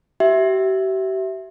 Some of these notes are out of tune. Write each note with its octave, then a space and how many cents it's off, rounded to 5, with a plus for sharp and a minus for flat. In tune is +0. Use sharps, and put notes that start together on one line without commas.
G4 -45 E5 +0